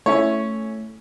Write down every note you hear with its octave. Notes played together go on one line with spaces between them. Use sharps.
A3 C#4 E4 C#5